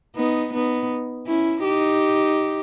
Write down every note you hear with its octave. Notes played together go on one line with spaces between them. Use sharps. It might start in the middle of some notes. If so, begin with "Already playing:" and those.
B3 D#4
B3 D#4
C#4 E4
D#4 G4